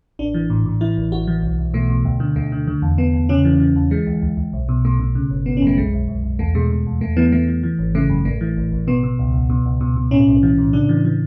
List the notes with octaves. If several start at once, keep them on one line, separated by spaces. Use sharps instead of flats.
A1 D4
E3
A2
A2
E3 E4
A1
A1 F#4
E3
B1
B1
B2 A3
B2
D2
D3
D2 A3
D3
D3
E2
E2 B3
E2
C#3 C#4
E3
E3
E2
E3 G#3
D2
D2
D2
B1
B2
B2 A3
B2
C#3
G#1
G#1 B3
C#4
F#2 A3
B1 G#3
B1
B1
B1
E2 A3
B2 G#3
B2
E2
E2 A3
E3 B3
E3 A3
E3
E3
G#1
C#3 A3
F#2
A1 A3
E3
A1
A1
B2 B3
B2
C#2
C#2
B2
C#2
B2
B2
A2 C#4
B1
E3
A2
C#3 D4
E3
E3